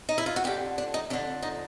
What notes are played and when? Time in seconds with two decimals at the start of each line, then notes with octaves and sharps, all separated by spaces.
0.09 D#4
0.18 E4
0.26 F4
0.36 F#4
0.44 F2 D3 G4
0.78 D4
0.94 D#4
1.10 F2 D3 D4
1.42 D#4